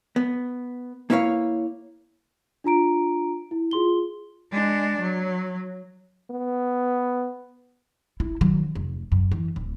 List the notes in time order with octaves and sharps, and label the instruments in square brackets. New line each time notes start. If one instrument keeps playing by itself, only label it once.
[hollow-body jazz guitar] B3
A#3 E4 B4 C#5 F5
[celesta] D4 F4 A#5 D7
E4
F4 G#4 C6 G7
[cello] G#3 D4
F#3
[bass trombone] B3
[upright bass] E4
D#3 F#3
F1
F#2
E3
D1